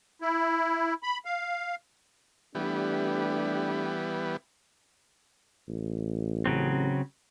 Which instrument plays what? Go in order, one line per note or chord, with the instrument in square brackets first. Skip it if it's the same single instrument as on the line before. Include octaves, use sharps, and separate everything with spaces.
[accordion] E4
B5
F5
[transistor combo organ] E3 G3 B3 [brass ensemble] A3 D4 G4
[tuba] A1
[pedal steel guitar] C#3 F#3 C4